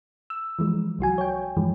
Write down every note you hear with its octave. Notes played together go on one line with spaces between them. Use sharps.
E6
E3 F3 G#3
C2 F#3 F#4 G#5
C#5 G5
G2 E3 F3 G#3